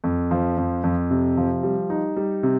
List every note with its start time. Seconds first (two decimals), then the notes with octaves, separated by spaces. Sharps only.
0.04 F2
0.31 F3
0.57 F2
0.84 F2
1.11 C3
1.37 F3
1.63 G3
1.90 D#4
2.17 G3
2.43 C3